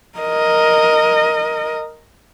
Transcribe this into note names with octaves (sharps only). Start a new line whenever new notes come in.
A#4 D#5